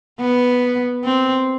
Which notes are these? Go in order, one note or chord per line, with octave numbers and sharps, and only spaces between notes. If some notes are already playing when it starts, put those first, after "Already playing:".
B3
C4